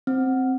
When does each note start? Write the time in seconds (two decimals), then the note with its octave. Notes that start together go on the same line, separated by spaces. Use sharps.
0.07 C4